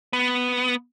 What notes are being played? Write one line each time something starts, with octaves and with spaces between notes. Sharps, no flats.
B3